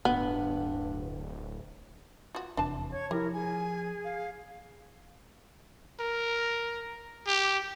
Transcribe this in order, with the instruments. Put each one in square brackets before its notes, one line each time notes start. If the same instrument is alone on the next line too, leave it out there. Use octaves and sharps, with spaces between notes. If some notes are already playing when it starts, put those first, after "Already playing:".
[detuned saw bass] D1 [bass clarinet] G2 [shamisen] B3
[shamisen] F4 F#4
[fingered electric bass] F1 E2 C3 [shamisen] D4 A5
[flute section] C#5 C#6 G#6
[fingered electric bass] F3 [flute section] E4 A#4 [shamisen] G4
[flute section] G#4 [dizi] G#5
[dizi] F5
[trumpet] A#4
G4